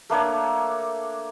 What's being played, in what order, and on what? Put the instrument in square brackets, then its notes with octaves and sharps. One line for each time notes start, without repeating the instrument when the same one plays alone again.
[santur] A3 A#3 D4 C#5